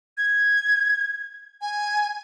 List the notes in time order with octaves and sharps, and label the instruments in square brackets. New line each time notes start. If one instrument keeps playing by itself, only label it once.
[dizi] G#6
G#5